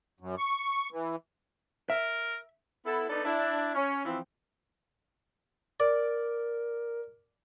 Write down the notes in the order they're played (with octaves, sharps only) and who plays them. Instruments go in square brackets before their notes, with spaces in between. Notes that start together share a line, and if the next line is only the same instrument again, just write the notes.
[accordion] F#2
C#6
E3
[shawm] A#4 [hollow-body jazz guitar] E5
[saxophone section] B3 E4 A4
B3 D4 D#4 A4 B4 D5
D4 E4
C#4
E3 F3 C4
[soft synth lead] A#4 [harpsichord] D5